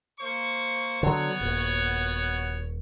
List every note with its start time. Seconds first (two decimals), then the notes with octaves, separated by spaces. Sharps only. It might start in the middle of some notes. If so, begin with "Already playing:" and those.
0.19 A#3 C5 C#6
1.03 D3 F#3 B3 F#4 C#5
1.41 D#1